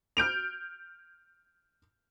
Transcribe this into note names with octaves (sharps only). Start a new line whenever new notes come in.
F6 G6 D7 F7